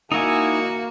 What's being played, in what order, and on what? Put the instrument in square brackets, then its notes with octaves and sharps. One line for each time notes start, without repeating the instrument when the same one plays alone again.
[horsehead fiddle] A#3 [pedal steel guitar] D#4 E4 G#5 [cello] F#4